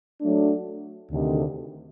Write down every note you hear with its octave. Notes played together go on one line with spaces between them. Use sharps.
F#3 A3 D4
D2 C3 D#3